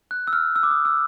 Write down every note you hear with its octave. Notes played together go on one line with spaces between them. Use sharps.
F#6
E6
F6
E6
D6
D#6
E6